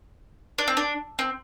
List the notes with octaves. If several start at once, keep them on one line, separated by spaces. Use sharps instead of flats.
D4
C4
D4
C4